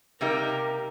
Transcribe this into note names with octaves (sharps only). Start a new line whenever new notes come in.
C3 G3 A#3 D#4 G4 A#4